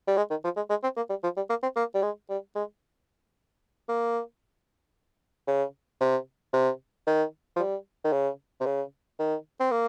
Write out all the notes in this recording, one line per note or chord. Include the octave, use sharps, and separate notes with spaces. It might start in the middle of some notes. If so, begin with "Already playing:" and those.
G3
G#3
D#3
F3
G#3
G#3
C4
A#3
G3
F3
G3
A#3
C4
A#3
G3
G#3
G3
G#3
A#3
C#3
C3
C3
D#3
F3
G3
D#3
C#3
C3
C#3
D#3
C4
A#3